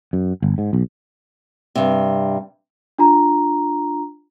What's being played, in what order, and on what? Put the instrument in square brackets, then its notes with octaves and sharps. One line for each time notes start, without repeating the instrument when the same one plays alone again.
[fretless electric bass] F#2
G1
G#2
B1
[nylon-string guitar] G2 C3
[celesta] D4 F4 A#5